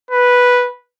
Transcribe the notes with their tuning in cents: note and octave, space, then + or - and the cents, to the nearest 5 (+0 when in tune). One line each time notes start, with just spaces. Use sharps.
B4 -5